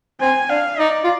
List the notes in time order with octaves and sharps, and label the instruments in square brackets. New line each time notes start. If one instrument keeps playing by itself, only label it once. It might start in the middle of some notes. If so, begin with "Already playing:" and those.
[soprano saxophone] C4 [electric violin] G#5
[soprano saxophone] D4 [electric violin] F5
[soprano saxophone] D#4 [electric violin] D5
[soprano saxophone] F4